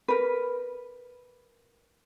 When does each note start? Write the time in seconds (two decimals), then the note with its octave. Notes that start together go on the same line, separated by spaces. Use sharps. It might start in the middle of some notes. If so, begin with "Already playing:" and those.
0.08 A#4 B4